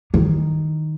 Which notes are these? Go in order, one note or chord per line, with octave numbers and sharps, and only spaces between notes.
D#3